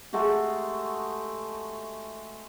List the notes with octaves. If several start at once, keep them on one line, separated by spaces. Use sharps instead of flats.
G#3 A3 F#4 G4